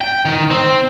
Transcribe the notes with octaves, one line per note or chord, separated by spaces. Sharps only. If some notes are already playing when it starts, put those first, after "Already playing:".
G5
D#3
C4